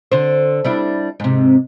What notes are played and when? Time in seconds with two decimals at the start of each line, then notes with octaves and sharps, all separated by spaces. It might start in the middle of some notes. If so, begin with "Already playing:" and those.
0.12 D3 C5
0.65 G3 D4 E4
1.20 G#2 C3